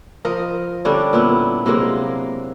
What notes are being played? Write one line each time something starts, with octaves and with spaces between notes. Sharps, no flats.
F3 A#4 D#5
D3 G3 C#4 D4
A#2 B3 E4
C3 F#3 G#3 A#3